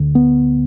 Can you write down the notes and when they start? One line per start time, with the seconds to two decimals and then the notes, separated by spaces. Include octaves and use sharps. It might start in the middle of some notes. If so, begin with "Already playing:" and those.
Already playing: D2 D3
0.15 B3